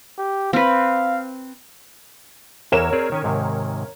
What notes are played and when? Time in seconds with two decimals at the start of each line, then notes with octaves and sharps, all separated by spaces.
0.18 G4
0.53 C4 B4 F5
2.72 E2 E3 A#4 C#5 E7
2.93 C4 G#4 D5
3.12 D#3 C#4 G#5
3.24 G#2 C3 D#3